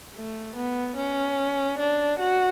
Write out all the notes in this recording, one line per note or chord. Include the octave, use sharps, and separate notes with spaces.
A3
B3
C#4
D4
F#4